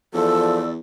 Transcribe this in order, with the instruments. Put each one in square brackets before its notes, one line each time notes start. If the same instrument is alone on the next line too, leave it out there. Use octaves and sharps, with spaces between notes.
[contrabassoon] E2 [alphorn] F3 [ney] A4 [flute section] D5 E6